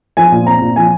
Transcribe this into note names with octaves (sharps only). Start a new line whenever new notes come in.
F3 G#5
A#2
C4 A#5
A#2
F3 G#5